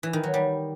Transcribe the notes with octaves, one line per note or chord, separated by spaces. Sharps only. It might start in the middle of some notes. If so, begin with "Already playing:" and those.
E3
D#3
F#3
G3